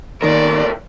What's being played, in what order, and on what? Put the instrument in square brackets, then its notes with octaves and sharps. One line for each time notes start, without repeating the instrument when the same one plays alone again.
[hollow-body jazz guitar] D#2 D#3 [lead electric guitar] A2 A#4 [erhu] D5